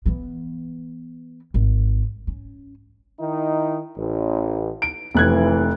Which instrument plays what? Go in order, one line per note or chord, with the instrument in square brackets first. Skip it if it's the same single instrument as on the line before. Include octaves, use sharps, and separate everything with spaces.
[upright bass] E3 B3
G#1
C#4
[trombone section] D#3 D#4 E4
A1
[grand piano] D7
[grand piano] F1 F#6 G#6 [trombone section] D#2 E3